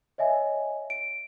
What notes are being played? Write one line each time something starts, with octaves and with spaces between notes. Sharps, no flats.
C#5 D#5 E5 G#5
D7